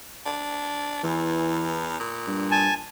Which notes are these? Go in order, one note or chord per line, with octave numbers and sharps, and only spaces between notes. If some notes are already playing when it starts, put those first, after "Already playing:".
D4
E2 E3
A#2
G2
G#5 A5